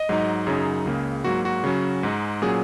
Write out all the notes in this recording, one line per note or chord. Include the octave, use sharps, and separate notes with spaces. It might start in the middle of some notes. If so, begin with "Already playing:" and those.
Already playing: D#5
G#2 F#3 D#4
F#2 C#3 F#3 D#4 G#4
C#2 C#3 A#3
G#2 F#3 A#3 F#4
F#4
C#3 F#3 C#4
G#2 G#3 D#4
A#2 F#3 C#4 G#4